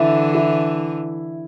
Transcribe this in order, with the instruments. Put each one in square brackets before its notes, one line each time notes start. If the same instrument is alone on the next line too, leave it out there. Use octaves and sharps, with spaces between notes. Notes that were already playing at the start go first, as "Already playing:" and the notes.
Already playing: [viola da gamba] D3 E3 [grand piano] E4
[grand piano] E4